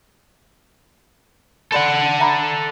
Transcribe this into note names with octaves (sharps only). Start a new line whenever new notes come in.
A4 D5 F#5 B5 C6
E5 A#5 B5